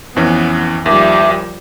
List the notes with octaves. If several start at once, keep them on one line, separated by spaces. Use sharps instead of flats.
F2 E3 B3 C#4
D#2 F3 G3 E5 D6